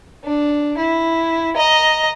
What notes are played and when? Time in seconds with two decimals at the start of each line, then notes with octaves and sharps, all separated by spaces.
0.24 D4
0.77 E4
1.56 D#5 A#5